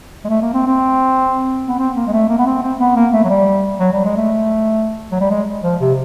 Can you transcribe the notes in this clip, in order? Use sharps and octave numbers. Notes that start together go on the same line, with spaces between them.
G#3
A3
A#3
C4
C4
B3
C4
A#3
G#3
A3
A#3
B3
C4
C4
B3
A#3
A3
F#3
G3
F#3
G3
G#3
A3
F#3
G3
G#3
F3
C3